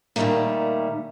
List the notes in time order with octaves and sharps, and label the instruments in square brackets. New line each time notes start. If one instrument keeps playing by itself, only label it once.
[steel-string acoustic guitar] A#2 D#3 F#3 G3 A3 A#3